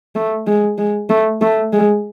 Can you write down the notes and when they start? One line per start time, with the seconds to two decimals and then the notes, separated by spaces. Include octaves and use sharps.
0.15 A3
0.47 G#3
0.78 G#3
1.10 A3
1.42 A3
1.73 G#3